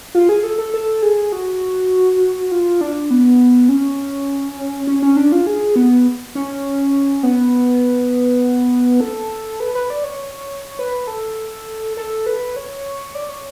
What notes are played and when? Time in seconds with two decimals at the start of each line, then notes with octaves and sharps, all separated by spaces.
0.15 F4
0.29 G#4
0.44 A4
0.58 A4
0.74 A4
1.03 G#4
1.32 F#4
2.51 F4
2.81 D4
3.11 B3
3.69 C#4
4.87 C#4
5.03 C#4
5.16 D4
5.32 F4
5.47 G#4
5.76 B3
6.35 C#4
7.23 B3
9.00 A4
9.60 B4
9.75 B4
9.90 D5
10.04 C#5
10.79 B4
11.07 A4
11.97 A4
12.26 B4
12.56 C#5
13.15 D5
13.29 C#5